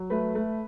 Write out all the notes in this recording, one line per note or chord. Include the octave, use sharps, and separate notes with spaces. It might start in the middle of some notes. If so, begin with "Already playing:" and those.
Already playing: F#3
A3 B4
A3